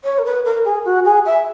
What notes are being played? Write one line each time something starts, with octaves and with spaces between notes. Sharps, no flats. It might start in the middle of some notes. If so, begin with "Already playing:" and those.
C#5
A#4
B4
A#4
G#4
F#4
G#4
E5